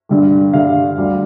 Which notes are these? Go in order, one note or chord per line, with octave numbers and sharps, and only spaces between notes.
G2 D3 G3
G2 D3 G3 F5
D2 D3 G3